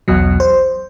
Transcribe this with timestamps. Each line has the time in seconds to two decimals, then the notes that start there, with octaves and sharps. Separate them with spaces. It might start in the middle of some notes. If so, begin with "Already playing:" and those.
0.08 B1 E2 B2 F#3
0.40 C5